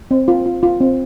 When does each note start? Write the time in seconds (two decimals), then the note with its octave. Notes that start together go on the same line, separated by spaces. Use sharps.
0.11 C4
0.28 F4
0.46 F4
0.63 F4
0.80 C4